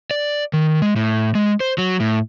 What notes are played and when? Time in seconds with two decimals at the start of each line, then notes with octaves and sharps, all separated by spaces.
0.11 D5
0.53 D#3
0.82 G#3
0.96 A2
1.35 G#3
1.60 C5
1.78 F#3
2.00 A2